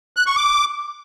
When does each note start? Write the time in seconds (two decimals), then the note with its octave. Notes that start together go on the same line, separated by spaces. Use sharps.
0.17 F#6
0.27 C#6
0.36 D6